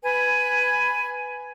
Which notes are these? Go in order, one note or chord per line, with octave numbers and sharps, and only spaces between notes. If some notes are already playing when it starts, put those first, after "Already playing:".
B4 G#5 B5